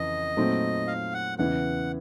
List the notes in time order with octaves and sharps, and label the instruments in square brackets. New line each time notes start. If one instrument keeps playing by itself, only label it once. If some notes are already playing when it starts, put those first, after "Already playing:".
Already playing: [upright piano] F2 C#3 E3 [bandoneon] D#5
[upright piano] A#2 F#3 A3 C4 D#4
[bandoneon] F5
F#5
[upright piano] E2 C#3 E3 [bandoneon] F#5